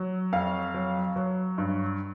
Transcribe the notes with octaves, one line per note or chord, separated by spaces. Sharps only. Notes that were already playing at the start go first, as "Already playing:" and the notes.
Already playing: F#3
F2 F5
F#3
F#3
G2